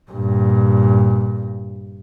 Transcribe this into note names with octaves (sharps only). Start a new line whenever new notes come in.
G2 A#2